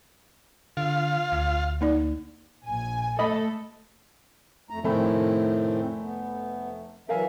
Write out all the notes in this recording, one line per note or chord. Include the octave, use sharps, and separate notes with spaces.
D3 F4 F5
D2
A#3 D#4 D5
A#1 G#5
A3 A4 D#5 B5
F2 A3 A#5
F1 A2 D#3 A3 C4 B5
B3
E3 F#3 A#4 E5 F5 G#5